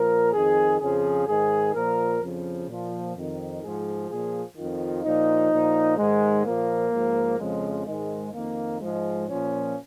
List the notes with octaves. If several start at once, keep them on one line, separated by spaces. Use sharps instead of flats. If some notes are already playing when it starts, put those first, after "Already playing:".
Already playing: A#2 F3 A#4
F2 D#3 G#4
F2 C#3 F3 G#4
G#2 D#3 G#4
A#2 F3 A#4
F2 C#3 F3
A#2 F3
F2 D#3
G#2 F3 G#4
A#2 F3 G#4
F2 D#3 F4
A#2 F3 D#4
A#2 F3
G#2 D#3 G#3
A#2 F3 A#3
G#2 F3
F2 C#3 F3 G#3
G#2 D#3 G#3
F2 D#3 A#3
G#2 F3 G#3
A#2 F3 C#4